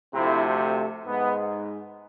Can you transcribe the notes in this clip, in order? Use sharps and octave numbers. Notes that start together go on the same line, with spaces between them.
D2 C3 F3 A3 C4 E4
G#2 G#3 B3